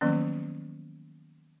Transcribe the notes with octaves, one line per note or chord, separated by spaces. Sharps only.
D#3 F3 F#3 A#3 B3 C#4